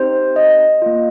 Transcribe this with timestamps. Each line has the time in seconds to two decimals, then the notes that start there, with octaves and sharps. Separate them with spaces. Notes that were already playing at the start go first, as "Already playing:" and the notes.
Already playing: C4 D#4 G4 C5
0.36 D#5
0.82 A#3 F4